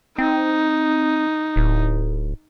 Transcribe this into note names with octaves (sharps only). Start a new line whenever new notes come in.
C4 D#4
D1